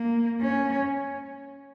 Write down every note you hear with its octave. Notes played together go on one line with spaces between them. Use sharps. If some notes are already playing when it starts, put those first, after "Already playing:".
Already playing: A#3
C#4